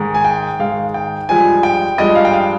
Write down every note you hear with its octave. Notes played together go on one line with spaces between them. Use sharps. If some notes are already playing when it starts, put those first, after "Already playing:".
Already playing: G#2 D#3 G#3
G#5
G5
G#2 D#3 G#3 F5
G5
G2 F3 G#3 G#5
G5
G2 F3 G#3 D#5
F5
G5
F5